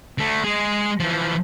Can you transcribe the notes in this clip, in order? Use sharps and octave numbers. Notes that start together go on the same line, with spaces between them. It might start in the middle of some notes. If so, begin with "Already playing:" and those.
D3 A3
G#3 G#4
E3 F3